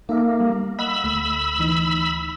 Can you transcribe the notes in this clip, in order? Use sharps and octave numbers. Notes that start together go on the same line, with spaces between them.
A#3 D#4 A4 E5
G3
D#5 F#5 B5 E6
D2 A3
D2 E3 D#4